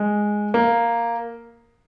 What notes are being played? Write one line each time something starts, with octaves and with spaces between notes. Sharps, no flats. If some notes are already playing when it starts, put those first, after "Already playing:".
Already playing: G#3
A#3